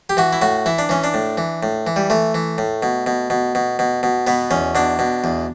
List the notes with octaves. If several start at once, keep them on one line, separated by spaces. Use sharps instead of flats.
G4
E3 F#4
E4
A2 F#4
E3 E4
D4
E3 C#4
D4
A2
E3
A2
E3
G3
E3 A3
E3
A2
B2
B2
B2
B2
B2
B2
B2 B3
E2 C#4
B2 D4
B2
E2